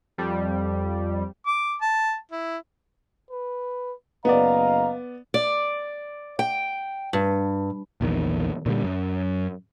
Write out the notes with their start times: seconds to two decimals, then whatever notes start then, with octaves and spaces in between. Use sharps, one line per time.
0.18 F2 G3
1.46 D6
1.82 A5
2.31 E4
3.31 B4
4.25 F#1 B3 D5 D#5 F5 A#5
5.34 D5
6.39 G5
7.13 G2
8.01 A#1 E2 D#3
8.66 A#2 D3 E3 G3
8.84 F#2